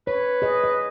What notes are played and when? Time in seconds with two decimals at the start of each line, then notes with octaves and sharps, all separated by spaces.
0.07 B4 C#5
0.42 G#4 D#5
0.64 D#5